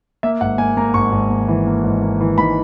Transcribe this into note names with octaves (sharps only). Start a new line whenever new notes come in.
A#3 E5
G#1 F#5
A#3 G#5
A#3 A#5
G#1 C#6
G#1
A#3
E3
A#3
G#1
A#3
E3
G#2 B5